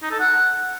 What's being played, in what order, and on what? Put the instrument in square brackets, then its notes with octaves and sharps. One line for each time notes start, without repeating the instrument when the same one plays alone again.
[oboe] D#4
A4
F#5